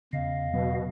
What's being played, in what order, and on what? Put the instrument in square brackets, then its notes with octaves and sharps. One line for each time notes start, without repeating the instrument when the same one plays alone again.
[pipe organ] E2 D#5 F5 [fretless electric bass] C#3
[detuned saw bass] B2 [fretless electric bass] F#3